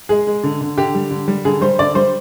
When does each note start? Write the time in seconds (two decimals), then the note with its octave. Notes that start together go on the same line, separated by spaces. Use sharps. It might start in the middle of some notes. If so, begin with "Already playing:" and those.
0.09 G#3 G#4
0.27 G#3
0.44 D3
0.61 D3
0.78 D3 G4
0.95 G3
1.10 D3
1.28 G3
1.44 D3 G#4
1.61 G3 C5
1.79 D3 D5
1.95 G3 C5